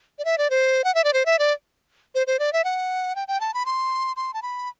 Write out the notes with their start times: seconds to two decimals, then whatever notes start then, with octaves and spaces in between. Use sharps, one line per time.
0.19 D5
0.25 E5
0.38 D5
0.50 C5
0.84 F#5
0.95 E5
1.04 D5
1.13 C5
1.26 E5
1.39 D5
2.15 C5
2.27 C5
2.39 D5
2.53 E5
2.64 F#5
3.16 G5
3.28 G5
3.40 A5
3.54 B5
3.66 C6
4.16 C6
4.34 A5
4.42 B5